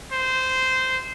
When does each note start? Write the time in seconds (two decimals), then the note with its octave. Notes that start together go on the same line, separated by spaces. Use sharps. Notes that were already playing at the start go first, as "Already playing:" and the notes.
0.12 C5